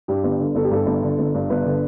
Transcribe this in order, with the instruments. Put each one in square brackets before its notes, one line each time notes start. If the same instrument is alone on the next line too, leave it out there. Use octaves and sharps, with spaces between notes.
[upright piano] G2 G4
G1
D3
G1 A4
G4
G2 A4
G1
D3
G1
G2
G1 B4
D3